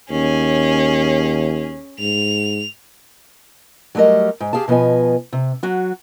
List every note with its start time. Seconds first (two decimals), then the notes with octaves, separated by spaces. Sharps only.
0.10 D#2 C#4 G#4
1.99 G#2 F7
3.95 F#3 G3 A3 A#4 D#5
4.40 G#2
4.53 G4 G#4 F5 A5
4.68 B2 F3 B3 D#5 G#5
5.33 C3
5.63 F#3 F#4